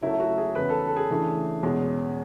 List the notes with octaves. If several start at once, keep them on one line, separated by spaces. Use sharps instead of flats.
C#3 F#3 A3 E4
F#4
G#4
E2 C#3 F#3 B4
A4
A4
G#4
C#3 E3 A3 D4
E2 B2 G#3 C#4